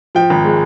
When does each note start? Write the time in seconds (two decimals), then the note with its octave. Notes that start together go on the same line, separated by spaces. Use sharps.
0.15 F3 G5
0.30 G#1
0.44 G#3